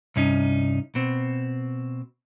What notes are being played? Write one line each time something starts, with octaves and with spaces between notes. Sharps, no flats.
C2 G2 C#4 D#4
B2 C4